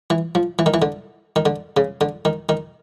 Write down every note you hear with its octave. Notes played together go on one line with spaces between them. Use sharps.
E3
F3
E3
D#3
E3
D3
D#3
D3
C#3
D3
D#3
D#3